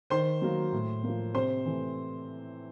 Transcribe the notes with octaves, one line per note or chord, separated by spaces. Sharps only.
D#3 C5 C6
F#3 A#3
A2
F3 A#3
C3 C5 C6
E3 A3